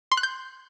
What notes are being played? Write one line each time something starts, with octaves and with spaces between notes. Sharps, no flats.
C6
F#6
G6